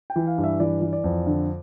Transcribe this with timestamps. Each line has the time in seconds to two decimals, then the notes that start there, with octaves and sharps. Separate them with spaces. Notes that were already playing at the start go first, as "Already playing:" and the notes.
0.10 G5
0.16 E3
0.27 F5
0.38 G2
0.44 E5
0.60 E3 D5
0.81 E3
0.93 D5
1.04 F2
1.27 D3